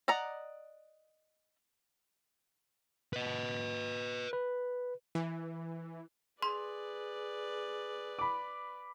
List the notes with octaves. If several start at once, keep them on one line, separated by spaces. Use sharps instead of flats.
D5 D#5 F#5 A#5
B4 D#5
B4
E3
G#4 B4 D5 C6
B5 D6